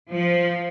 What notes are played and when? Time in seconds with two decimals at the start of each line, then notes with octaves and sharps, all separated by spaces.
0.11 F3